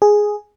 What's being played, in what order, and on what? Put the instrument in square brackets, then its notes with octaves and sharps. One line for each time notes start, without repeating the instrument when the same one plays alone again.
[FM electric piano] G#4